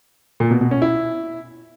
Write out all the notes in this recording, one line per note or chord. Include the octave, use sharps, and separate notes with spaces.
A#2
B2
B2
C#4
E4